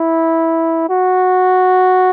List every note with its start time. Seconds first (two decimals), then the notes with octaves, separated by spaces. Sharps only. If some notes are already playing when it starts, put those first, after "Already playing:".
Already playing: E4
0.89 F#4